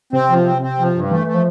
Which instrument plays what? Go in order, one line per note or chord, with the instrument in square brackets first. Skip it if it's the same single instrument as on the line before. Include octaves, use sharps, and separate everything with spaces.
[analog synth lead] C3 [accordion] C4
[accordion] F3
C4
C4
F3
G2
[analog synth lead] E3 [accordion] A3
[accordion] A3
[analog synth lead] F3